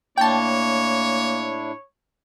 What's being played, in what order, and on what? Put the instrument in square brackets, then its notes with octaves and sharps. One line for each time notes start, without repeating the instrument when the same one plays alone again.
[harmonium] A2 D4 E4 [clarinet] A#3 [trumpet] C#5 [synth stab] G5 A5